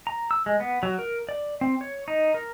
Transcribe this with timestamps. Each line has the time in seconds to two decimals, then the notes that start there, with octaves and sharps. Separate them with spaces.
0.07 A#5
0.31 E6
0.46 G#3
0.60 B3
0.83 F#3
0.99 A#4
1.29 D5
1.61 C4
1.81 C#5
2.08 D#4
2.34 A#4